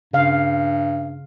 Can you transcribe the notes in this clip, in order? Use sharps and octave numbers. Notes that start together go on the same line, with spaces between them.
G2 C#3 F5